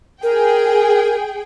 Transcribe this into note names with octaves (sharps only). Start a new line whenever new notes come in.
G#4 A#4 G5